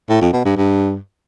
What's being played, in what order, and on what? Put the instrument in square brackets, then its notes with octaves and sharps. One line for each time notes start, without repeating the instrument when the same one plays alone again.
[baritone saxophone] A2
F2
B2
G2
G2